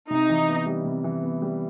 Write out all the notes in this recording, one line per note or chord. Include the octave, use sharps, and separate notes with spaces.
C3 D#4
E3
B3
G3
C3
E3
B3
G3